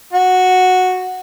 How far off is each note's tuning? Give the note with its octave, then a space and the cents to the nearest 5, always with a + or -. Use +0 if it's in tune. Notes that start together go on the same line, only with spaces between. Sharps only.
F#4 -5